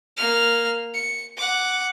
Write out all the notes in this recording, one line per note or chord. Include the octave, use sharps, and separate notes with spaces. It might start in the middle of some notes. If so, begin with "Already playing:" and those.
A#3 F6
C#7
F#5 D6